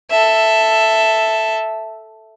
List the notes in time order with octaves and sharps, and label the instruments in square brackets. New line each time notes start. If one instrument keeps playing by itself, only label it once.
[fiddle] A4 E5